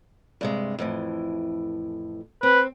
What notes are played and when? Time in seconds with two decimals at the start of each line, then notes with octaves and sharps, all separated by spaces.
0.41 G2 C3 G#3
0.79 F2 A2 E3
2.43 C4 B4